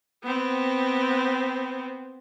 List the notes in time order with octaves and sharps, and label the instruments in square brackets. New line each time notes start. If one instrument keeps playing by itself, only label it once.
[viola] B3 C4